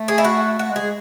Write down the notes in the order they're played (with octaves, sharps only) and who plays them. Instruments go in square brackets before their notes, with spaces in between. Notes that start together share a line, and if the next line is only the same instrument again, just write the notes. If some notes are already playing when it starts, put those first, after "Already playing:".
Already playing: [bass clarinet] A3
[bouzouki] G#4
E4
F#4
[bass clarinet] A3 [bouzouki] F#4
[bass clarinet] G#3
[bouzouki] G#4
[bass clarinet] G#3